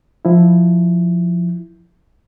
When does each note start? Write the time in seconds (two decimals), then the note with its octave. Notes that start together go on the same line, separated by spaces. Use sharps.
0.25 F3 E4